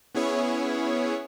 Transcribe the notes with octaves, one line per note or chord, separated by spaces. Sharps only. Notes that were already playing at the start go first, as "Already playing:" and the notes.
B3 C#4 E4 G#4 C#5